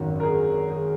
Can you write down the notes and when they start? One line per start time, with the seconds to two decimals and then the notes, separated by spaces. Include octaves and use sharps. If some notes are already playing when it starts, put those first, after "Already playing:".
Already playing: G#1 F#2 D#3
0.20 A#4
0.23 G#4
0.70 G#4